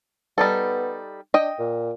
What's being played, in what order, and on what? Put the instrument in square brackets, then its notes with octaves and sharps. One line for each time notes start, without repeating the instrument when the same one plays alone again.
[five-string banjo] G3 D#4 A4 [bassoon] B3
[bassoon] D4 [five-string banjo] D#5 G5
[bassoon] A#2